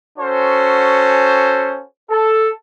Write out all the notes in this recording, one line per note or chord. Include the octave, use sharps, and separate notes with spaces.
C#4 F#4 A4 C5
A4